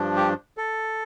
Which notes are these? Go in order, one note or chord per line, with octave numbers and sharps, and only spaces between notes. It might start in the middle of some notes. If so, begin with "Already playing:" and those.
Already playing: G2 F3 D4
G4
A4